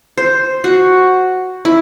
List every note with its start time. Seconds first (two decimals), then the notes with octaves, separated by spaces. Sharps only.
0.17 C5
0.64 F#4
1.65 E4